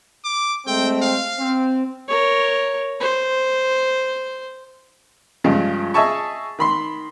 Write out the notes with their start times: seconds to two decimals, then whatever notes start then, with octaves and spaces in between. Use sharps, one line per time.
0.24 D6
0.67 G#3 A3 C4 G5
1.02 F5
1.40 C4
2.08 A#4 C#5
3.00 C5
5.44 G2 C#3 F3 G#3
5.94 G#4 D#5 E5 G#5 A5 C#6
6.59 D#3 B5 C6